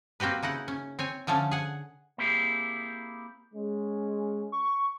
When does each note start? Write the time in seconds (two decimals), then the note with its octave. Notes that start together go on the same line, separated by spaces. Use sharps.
0.20 A#3 C4 F#4 G4 B4
0.43 C#3 D#4 E4 F#5
0.68 C#4
0.99 C4 C#5 G#5
1.27 D3 F3 A3 C#4 A4
1.51 G#4 F#5
2.18 A#3 C4 E4 G4 G#4
3.54 G#3 C#4
4.52 C#6